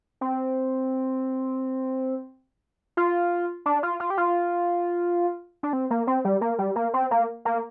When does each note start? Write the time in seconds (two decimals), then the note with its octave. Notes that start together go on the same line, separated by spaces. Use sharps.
0.21 C4
2.97 F4
3.66 D4
3.83 F4
4.00 F4
4.10 G4
4.17 F4
5.63 D4
5.73 C4
5.90 A#3
6.07 C4
6.25 G3
6.41 A#3
6.58 G3
6.76 A#3
6.94 C4
7.11 A#3
7.45 A#3